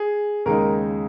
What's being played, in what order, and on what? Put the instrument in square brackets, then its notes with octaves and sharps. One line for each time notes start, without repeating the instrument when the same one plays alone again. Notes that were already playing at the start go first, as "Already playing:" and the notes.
Already playing: [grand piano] G#4
D#2 C#3 G#3 D#4 A#4